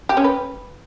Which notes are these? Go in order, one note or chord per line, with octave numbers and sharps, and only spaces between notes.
G4
C#4
B4